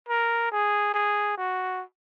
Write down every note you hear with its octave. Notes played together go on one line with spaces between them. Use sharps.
A#4
G#4
G#4
F#4